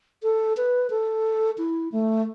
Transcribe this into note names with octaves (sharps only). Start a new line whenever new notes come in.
A4
B4
A4
E4
A3